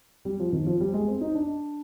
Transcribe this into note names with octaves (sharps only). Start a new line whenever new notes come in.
G3
F3
D#3
F3
G3
G#3
C4
D#4
D4